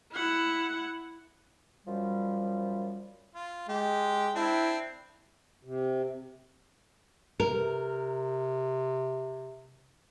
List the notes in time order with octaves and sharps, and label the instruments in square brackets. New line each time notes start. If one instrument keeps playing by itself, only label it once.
[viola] E4 F#5
[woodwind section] F#2 F3 G3
[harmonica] F4
[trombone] G#3 [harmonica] G4
[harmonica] C4 D4 [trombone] E4
[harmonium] C3
[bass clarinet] C3 [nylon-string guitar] A#4